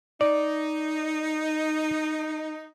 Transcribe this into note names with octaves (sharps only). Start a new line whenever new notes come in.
D#4 D5